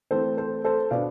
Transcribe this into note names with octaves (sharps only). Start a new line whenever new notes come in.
E3 A3 C4 A4 C5
A4 C5
A4 C5
B2 B3 D4 D5 F5